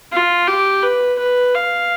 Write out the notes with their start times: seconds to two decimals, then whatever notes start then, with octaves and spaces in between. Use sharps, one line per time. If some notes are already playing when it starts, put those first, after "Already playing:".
0.13 F4
0.48 G4
0.83 B4
1.19 B4
1.55 F5